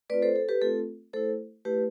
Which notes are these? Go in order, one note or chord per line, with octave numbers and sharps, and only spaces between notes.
A3 C4 F4 B4 D5
A4 C5
A4
G4 B4
A3 C4 F4 A4
A3 E4 A4 C5
A3 E4 G4 B4